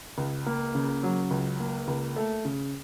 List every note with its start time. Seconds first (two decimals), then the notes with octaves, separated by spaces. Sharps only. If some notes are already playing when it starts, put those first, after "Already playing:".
0.18 C#2
0.46 A#3
0.75 C#3
1.03 F#3
1.31 C#2
1.60 A#3
1.88 C#2
2.16 A3
2.45 C#3